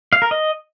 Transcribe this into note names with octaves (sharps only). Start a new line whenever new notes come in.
F5
A#4
D#5